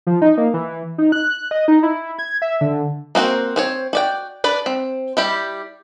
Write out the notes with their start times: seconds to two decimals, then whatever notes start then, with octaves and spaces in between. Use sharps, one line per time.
0.07 F3
0.22 D#4
0.38 A#3
0.54 E3
0.98 D#4
1.12 F#6
1.51 D#5
1.68 D#4
1.83 E4
2.19 G#6
2.42 E5
2.61 D3
3.15 A#3 C4 F#4 C5
3.56 C4 C5 C#5
3.93 F#4 D5 G5
4.44 D4 B4 D5
4.66 C4
5.17 G3 E4 G4